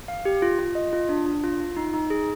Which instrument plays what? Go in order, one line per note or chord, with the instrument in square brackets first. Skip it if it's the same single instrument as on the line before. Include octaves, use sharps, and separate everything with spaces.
[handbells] F5
G4
F4
F4
D#5
F4
D4
D4
F4
F4
D#4
D#4
G#4